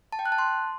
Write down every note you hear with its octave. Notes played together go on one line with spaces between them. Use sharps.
A5
G5
F#6
A5
C6